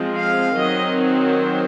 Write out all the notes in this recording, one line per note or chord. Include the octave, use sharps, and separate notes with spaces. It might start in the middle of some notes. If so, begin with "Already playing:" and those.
Already playing: F3 G#3 C4
F5
D#3 F#3 C4 D#5